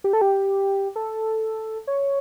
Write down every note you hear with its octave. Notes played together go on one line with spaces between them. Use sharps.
G4
A4
G4
A4
C#5